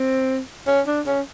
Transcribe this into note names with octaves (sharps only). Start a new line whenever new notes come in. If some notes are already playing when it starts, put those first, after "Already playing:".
Already playing: C4
C#4
D4
C#4